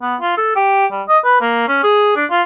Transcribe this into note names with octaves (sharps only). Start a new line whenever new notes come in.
B3
F4
A4
G4
G3
D#5
B4
A#3
C#4
G#4
D4
F4